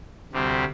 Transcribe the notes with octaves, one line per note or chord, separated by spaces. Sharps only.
D2 C3 G3 C4